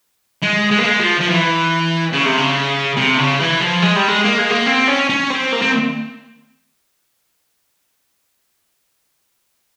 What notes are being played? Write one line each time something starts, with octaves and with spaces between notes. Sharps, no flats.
G#3
G#3
A#3
G#3
F3
F3
E3
C#3
C3
C#3
C3
C#3
E3
F3
G#3
G3
G#3
A#3
G#3
A#3
C4
C#4
C#4
C4
A#3
C4